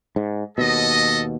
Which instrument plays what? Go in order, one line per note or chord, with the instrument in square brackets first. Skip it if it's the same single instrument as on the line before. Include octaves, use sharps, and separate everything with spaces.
[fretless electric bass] G#2
[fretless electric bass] D#2 B2 [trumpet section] A4 D#5